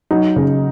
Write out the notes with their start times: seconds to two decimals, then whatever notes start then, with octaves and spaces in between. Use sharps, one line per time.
0.11 F#3 D#4
0.36 C#3